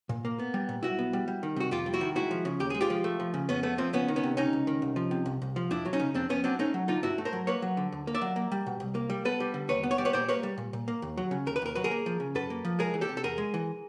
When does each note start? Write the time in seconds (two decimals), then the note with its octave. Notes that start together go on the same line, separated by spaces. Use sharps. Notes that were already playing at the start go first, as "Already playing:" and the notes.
0.09 A#2
0.25 A#3
0.39 B3
0.54 G3
0.69 A#2
0.83 B1 E4 F#4
0.99 B3
1.13 G3
1.28 G3
1.43 D#3
1.56 C3 F#4
1.71 F2 F4 G4
1.86 G3
1.94 E4 F#4
2.01 D#3
2.15 G#3 E4 F#4
2.31 F3
2.45 C#3
2.60 D#2 G4
2.70 G#3 G#4
2.81 F4 G4
2.90 F3
3.04 A3
3.20 F3
3.34 C#3
3.49 F2 B3 C#4
3.63 A3 B3
3.78 F3 C4
3.93 C#2 B3 C#4
4.08 D#3
4.16 B3 C#4
4.23 C3
4.37 C#2 C#4 D#4
4.53 C#2
4.67 D#3
4.82 C2
4.96 F3
5.11 C3
5.26 C2
5.42 C2
5.56 F3
5.71 F2 D4 E4
5.86 F#3
5.93 C#4 D#4
6.00 C#3
6.15 F2 C4 D4
6.29 F2 B3 C#4
6.44 F#3 C4 D4
6.59 A3 C#4 D#4
6.74 F#3
6.88 D3 D#4 F4
7.03 G2 E4 F#4
7.18 A3
7.25 A#4 C5
7.33 F#3
7.47 A#3 B4 C#5
7.62 F#3
7.77 D3
7.92 D2
8.07 A#3
8.14 D5 E5
8.21 F#3
8.36 A#3
8.52 G3
8.66 B2
8.80 C2
8.95 A#3
9.10 G3
9.25 B3 A4 B4
9.40 G3
9.54 D3
9.69 D#2 B4 C#5
9.83 B3
9.91 C#5
9.98 G3 D5
10.05 B4 C#5
10.13 A#2 C5 D5
10.29 A#3 B4 C#5
10.43 G3
10.58 A#2
10.73 A#2
10.88 A#3
11.02 D#2
11.18 F#3
11.31 C#3
11.46 D#2 A#4
11.56 B4
11.62 D#2 A#4
11.75 F#3 B4
11.84 G#4 A#4
11.91 A#3
12.06 F3
12.20 C#3
12.35 F#2 A4 B4
12.50 A#3
12.65 F3
12.79 G#3 G#4 A#4
12.94 E3
13.01 G4 A4
13.09 C3
13.17 A4
13.24 E2 G#4 A#4
13.38 G#3
13.54 E3